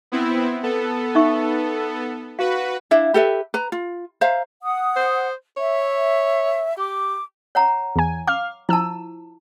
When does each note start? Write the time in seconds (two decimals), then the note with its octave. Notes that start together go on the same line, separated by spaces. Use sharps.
0.12 B3 C4 E4
0.63 B3 A4
1.15 D#4 E5 C#6
2.39 F#4 B4 F5
2.91 D4 E4 E5 F5
3.14 G4 A4 B4 E5
3.54 B4 A#5
3.72 F4
4.21 C5 E5 F5 A#5
4.62 F#5 D#6
4.96 C5
5.57 C#5 E5
6.77 G4 D6
7.55 C#5 F#5 A#5
7.96 E2 G#5
8.27 F5 D6 F6
8.69 F3 E4 A5 E6